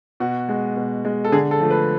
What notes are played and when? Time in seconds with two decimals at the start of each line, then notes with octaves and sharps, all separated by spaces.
0.20 B2 F#4
0.49 G#3
0.76 B2
1.05 G#3
1.24 A4
1.32 D3 G#4
1.51 A4
1.61 F3 A3
1.70 B4